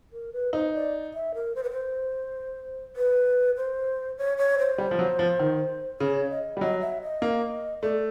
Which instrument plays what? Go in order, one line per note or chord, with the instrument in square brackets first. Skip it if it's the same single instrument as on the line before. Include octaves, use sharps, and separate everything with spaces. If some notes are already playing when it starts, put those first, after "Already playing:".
[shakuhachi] A#4
B4
[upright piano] D#4 [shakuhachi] C5
[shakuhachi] D5
E5
A#4
C5
B4
C5
B4
C5
C#5
C#5
C5
[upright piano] G3
F3
F#3
F3
D#3
[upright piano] C#3 [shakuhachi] C#5
[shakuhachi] D#5
[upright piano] G3
[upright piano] F#3 [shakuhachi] D#5
[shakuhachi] E5
D#5
[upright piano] A#3
[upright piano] A3 [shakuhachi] D5